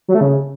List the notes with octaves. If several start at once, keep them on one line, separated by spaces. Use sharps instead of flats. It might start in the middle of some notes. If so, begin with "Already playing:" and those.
F#3
A3
C#3